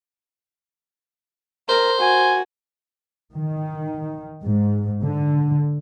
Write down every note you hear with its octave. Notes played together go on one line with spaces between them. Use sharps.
A#4 C5
F#4 G#5
D#3
G#2
D3